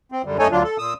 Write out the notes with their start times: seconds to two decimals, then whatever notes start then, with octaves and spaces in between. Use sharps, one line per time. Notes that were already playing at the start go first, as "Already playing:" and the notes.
0.12 C4
0.25 F#2 D3 G3
0.39 F#2 A3 D#4 A4 C#5 G#5
0.52 D2 D3 F#3 D4 F4
0.63 A4
0.78 A#2 D#6 E6